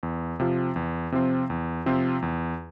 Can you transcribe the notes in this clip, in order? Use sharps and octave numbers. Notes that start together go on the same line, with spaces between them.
E2
C3 F3 C4 F4
E2
C3 F3 C4 F4
E2
C3 F3 C4 F4
E2